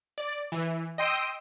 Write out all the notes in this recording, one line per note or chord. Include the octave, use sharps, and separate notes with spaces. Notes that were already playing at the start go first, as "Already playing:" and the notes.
D5
E3
D#5 G5 C6 D#6 E6 D7